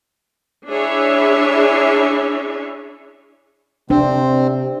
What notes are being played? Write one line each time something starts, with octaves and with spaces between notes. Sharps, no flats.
D4 E4 G#4 C#5 E5
C3 C4 D4 C5